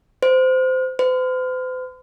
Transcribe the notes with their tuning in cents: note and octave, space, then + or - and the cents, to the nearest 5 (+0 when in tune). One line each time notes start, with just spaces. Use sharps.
C5 -20
C5 -45